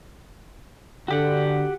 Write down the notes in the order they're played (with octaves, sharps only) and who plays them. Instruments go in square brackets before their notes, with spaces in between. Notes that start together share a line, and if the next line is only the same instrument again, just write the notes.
[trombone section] D3 [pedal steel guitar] F#4 G4 F#5